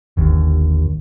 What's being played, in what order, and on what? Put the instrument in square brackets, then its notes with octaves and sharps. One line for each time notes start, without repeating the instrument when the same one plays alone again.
[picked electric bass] G1 D#2